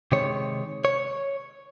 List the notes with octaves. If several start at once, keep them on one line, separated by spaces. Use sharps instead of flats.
C3 D#3 G#3 C#5
C#5